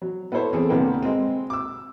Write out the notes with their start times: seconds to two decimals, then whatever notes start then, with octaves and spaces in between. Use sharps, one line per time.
0.02 F#3
0.32 B3 E4 A4 C5 C#5
0.53 E2 C4 G#4 A4
0.69 C2 D3 A#3 B4 G5
1.03 G#3 C4
1.50 D6 E6